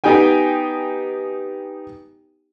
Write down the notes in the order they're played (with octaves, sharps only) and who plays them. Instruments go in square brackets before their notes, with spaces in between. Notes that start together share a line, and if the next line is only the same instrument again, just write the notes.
[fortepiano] B3 D#4 G4 G5 G#5